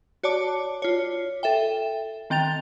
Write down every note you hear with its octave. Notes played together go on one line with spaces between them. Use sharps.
F#4 C#5 D5 A5 D6
F4 C#5
A4 E5 G5
D#3 C4 G5 A6 F7